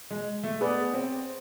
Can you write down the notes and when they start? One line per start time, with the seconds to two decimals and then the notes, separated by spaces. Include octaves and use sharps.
0.11 G#3
0.43 A3
0.61 B3 G#4 B4 D5
0.94 C4